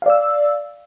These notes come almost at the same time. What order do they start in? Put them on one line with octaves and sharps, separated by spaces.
F5 D5 E6